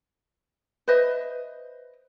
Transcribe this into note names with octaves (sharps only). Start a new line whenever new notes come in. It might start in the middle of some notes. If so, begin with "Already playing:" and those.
B4 C5 D#5 E5